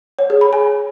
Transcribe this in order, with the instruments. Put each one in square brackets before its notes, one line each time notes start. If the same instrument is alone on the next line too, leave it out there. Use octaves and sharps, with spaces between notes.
[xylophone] C#5
G#4
B5
G#5